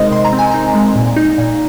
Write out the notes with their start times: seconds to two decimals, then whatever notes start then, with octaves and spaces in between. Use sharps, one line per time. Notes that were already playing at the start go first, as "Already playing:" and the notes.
Already playing: C3 G#3 C4 D#4 A#4 C5 D#5
0.11 C3 C6
0.25 A#5
0.33 C4
0.39 G#5
0.51 D#4 A#5
0.75 G#3
0.96 A#2
1.16 D#4
1.38 A#2